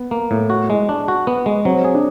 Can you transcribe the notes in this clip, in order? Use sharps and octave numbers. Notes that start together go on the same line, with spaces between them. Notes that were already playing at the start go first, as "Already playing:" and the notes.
Already playing: B3
A#3
A2
F#4
G#3
D4
F#4
B3
G#3
F#3 C4
G#4
D4